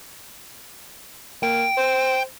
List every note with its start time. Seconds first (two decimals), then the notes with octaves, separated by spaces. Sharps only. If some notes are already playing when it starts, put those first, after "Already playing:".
1.43 A#3 G5
1.77 C5